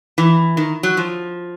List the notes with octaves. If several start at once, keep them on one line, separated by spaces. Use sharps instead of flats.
E3
D#3
F#3
F3